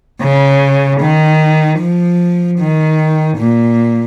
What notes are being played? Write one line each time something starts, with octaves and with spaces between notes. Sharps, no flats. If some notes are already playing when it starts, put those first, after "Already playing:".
C#3
D#3
F3
D#3
A#2